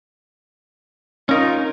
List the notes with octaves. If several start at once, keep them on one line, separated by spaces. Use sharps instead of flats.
C#4 D#4 F4 A#4